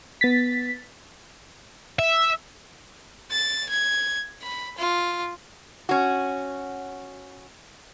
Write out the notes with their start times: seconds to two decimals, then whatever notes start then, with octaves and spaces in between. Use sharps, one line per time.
0.21 B3 A6 B6
1.99 E5
3.31 A6
3.69 G#6
4.42 B5
4.78 F4
5.89 C#4 F#4